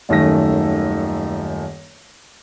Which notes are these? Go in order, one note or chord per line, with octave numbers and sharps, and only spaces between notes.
D#1 F#2 D#3 A3 A#6